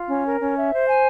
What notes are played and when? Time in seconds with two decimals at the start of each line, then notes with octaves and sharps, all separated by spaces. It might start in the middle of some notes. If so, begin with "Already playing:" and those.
Already playing: F4
0.08 C#4
0.24 A#4
0.40 C#4
0.56 E5
0.71 C5
0.87 G#5